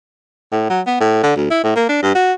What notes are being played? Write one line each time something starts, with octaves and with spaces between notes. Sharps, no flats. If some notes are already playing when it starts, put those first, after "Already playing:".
A2
F#3
B3
A2
D3
D2
E4
A2
A#3
D4
G2
F#4